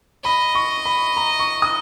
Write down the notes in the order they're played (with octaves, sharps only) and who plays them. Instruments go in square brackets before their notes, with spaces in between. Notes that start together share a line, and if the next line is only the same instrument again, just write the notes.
[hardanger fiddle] D#5 [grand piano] B5
[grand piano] C#6
B5
A#5
C#6
D#6